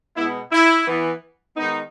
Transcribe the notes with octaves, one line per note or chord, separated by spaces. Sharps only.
B2 G#3 B3 E4
E4
E3 B3
D#3 G#3 B3 D#4